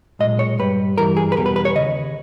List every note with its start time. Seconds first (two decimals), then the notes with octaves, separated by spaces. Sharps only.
0.19 B1 A#2 G#3 D#5
0.39 C#5
0.59 G2 G3 B4
0.97 G2 E3 G3 A#4
1.17 G#4
1.32 B4
1.36 E2 B2 G3 A#4
1.46 B4
1.56 B4
1.65 C#5
1.75 D#2 C#3 D#5